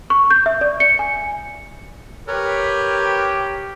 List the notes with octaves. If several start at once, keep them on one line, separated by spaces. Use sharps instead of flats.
C#6
G6
E5
D5
C#7
G#5
G4 A#4 B4 C#5